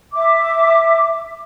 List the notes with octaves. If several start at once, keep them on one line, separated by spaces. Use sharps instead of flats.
E5 D6